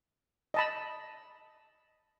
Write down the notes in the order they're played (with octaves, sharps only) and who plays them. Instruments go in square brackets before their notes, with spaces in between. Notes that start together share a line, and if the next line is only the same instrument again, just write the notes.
[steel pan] D#5 A5 B5